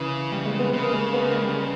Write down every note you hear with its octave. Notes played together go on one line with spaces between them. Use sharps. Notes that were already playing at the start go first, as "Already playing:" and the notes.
Already playing: C#3 E3
G3
G#3
B3
C#3 B3
A#3
G#3
B3
A#3
G#3
G3